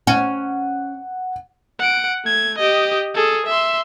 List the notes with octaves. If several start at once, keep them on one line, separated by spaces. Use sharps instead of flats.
C#4 F#5
F#5 D7
A3 G#6
G4 D#5
G#4 A4
E5 C6